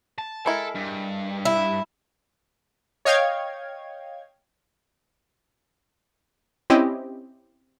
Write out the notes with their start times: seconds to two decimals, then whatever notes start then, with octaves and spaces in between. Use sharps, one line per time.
0.18 A5
0.46 G#3 E4 A4 A#4
0.75 G2
1.45 E4
3.05 C#5 D#5 F5 G5 G#6
6.70 C4 C#4 E4 G4 D#5